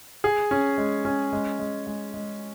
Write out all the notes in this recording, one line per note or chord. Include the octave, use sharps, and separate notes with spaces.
G#4
C#4
G#3
C#4
G#3
G#3
G#3
G#3